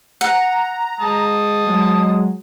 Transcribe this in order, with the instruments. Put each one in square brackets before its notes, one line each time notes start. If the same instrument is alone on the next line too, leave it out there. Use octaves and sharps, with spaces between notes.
[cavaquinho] F#5 [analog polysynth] A#5
[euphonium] G#3 [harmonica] A5 D#6
[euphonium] F#3 [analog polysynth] G#3